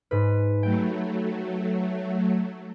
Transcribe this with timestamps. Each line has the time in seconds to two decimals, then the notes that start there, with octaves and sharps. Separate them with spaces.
0.11 G#2 B4
0.63 F#3 A3 G5